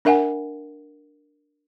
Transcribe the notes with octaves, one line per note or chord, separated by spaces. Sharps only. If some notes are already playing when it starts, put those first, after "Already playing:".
D4 A#4 E5 F#5 G#5